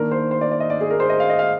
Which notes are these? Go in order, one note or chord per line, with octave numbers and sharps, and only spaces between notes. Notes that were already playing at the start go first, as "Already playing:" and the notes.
Already playing: D#3 A#3 D4 A#4
C5
C5
D5
D5
D#5
D5
G#4
A#4
C5
D#5
F5
D#5
F5